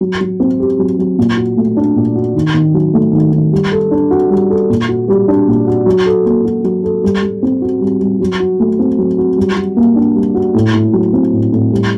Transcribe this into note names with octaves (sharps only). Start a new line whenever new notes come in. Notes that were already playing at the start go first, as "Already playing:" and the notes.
F#3
F#3
C4
G4
F#3
F#3
A#2
F#4
A3
D4
A#2
F#4
D#3
D#3
F#3
A3
D#3
D#3
G3
A4
D4
F#4
G3
A4
A#2
F#4
G3
D4
A#2
F#4
F#3
A4
A#3
F#4
F#3
A4
G3
G3
C4
F#4
G3
G3
F#3
F#4
A3
C4
F#3
F#4
G3
F#4
A#3
D4
G3
F#4
A2
A2
F#3
C4
A2
A2
G3